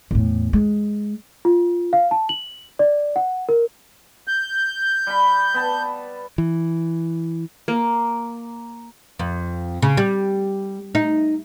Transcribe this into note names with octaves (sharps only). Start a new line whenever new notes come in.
E2 A2
G#3
F4
F5
A5
F#7
D5
F#5
A#4
G6
G3 B5
B3 G5 A5
E3
A#3
F2
C#3
G3
D#4